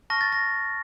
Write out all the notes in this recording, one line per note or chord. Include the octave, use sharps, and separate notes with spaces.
A5 C#6 F6 A#6
A6
A#6